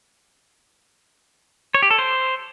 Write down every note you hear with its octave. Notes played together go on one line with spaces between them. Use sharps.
C#5
G4
A4
C5